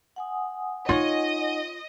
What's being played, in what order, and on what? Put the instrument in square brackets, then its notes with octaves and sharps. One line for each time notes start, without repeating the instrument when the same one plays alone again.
[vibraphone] F#5 G#5 D#6
[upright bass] D#4 [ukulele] F4 C#5 [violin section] D#5